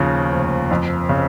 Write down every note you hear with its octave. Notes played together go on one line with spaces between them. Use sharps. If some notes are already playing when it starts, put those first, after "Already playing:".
Already playing: D#2 C#3 F3
F1
F2
C#3